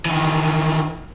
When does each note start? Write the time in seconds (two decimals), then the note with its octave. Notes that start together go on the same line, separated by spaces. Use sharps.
0.06 D#3 E3